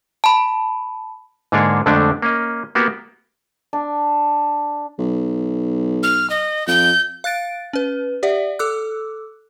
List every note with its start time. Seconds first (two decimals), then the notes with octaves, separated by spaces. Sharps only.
0.24 A5 B5
1.52 G#2 D3 A#3 D4 G#4 C#5
1.86 F2 D3 G#3 A3 D4
2.22 A#3 C#4 D#5
2.75 A#3 B3 F#4 G4
3.73 D4
4.99 B1
6.03 F6
6.30 D#5
6.67 F2 G6
7.24 F5 F#6 A6 D7
7.73 C#4 B4
8.23 G4 D5 E5 F#5
8.59 A4 D6 E6 F#6